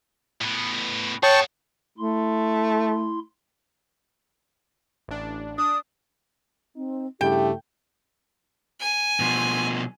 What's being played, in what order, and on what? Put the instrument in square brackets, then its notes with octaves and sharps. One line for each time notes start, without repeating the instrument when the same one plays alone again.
[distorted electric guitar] A2 B3
[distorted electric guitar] G#4 F#5 [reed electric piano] C#5 [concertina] G5 A5 C#6
[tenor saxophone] A3 [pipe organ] E4 C6
[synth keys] A1 D4
[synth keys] D4 [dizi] D#6
[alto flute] C4 [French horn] D#4
[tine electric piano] G2 C#3 E4 [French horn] A3 [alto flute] G4 [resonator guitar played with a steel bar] G5
[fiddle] G#5
[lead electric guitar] B2 F3